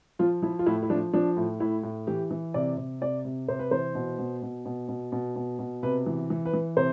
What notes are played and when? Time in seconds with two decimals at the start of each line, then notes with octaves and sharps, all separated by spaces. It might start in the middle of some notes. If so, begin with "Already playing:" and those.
0.19 F3 F4
0.42 F3 E4
0.59 F4
0.66 A2 E4
0.83 E4
0.90 F3 D4
1.13 F3 D4
1.37 A2
1.60 A2 E4
1.83 A2
2.07 E3 G4
2.31 E3
2.54 C3 D5
2.77 C3
3.01 C3 D5
3.25 C3
3.48 C3 C5
3.59 B4
3.71 E3 C5
3.95 B2
4.18 B2
4.42 B2
4.66 B2
4.89 B2
5.12 B2
5.36 B2
5.59 B2
5.83 C3 B4
6.06 E3
6.30 E3
6.45 B4
6.53 E3
6.77 C3 C5